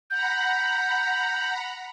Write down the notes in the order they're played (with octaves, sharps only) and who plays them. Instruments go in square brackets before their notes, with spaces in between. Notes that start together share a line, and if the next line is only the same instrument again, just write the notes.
[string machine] F#5 A#5 B5 [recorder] G6